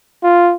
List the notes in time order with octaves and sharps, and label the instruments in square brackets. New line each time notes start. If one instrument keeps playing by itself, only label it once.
[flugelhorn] F4